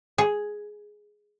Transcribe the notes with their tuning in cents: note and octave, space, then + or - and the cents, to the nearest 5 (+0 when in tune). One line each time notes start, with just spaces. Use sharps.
G#4 +5